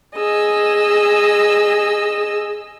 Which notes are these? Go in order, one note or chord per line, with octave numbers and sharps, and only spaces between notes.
G#4 D#5 E6